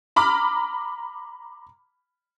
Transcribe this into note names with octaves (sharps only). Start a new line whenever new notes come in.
A#5 B5 D6 F6